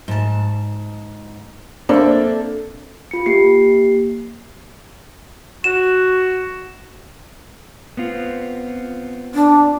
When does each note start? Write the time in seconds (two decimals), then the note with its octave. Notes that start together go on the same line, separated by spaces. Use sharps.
0.08 G#2 A5
1.89 A#3 C4 D4 A4 E5
3.11 F4 C#7
3.26 A#3 G4 C7
5.64 F#4 E7
7.97 B3 C4 F4
9.35 D4